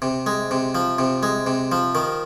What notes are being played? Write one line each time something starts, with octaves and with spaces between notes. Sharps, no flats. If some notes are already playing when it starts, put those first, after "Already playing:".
C3
G#3
C3
F3
C3
G#3
C3
F3
D#3